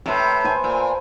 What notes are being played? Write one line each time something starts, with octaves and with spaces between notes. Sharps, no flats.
A2 C3 B4 A5 A#5
C5 G#5 A5
A#2